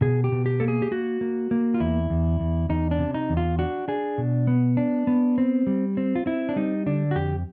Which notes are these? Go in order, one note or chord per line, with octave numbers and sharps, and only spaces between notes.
B2 G#4
G4
B2
G4
A#3 A4
G#4
G4
A#3 F#4
A#3
A#3
F4
E2 E4
E2
E2
E2 D#4
D4
C3
D#4
E2
F4
D4 F#4
D4 G#4
B2
B3
D4
B3
C4
G3
C4
F4
C4 E4
D4
G3 D#4
D3 D4
F#4
F2 G4